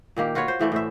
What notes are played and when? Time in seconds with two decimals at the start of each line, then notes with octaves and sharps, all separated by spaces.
0.16 A#2 D#3 A#3 G4
0.35 F4 F#4 B4 C#5
0.48 C5
0.59 A2 E3 A3 D5
0.72 A2 C5 E5